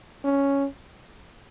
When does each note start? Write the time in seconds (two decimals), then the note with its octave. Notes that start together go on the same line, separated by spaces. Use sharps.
0.24 C#4